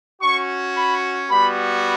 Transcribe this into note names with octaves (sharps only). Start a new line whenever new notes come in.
C#4 F#4 C#6
B5
G3 B3 F#4 B5